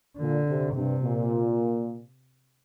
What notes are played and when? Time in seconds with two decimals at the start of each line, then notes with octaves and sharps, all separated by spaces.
0.18 A#2 D3
0.47 C3
0.75 G2 C3
1.03 A#2